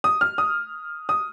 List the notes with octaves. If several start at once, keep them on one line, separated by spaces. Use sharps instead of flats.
D#6
F6
D#6
D#6